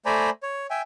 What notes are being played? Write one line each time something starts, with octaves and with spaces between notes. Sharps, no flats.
A3 C5 D5 G#5 A#5 B5
C#5
E5 G5 G#5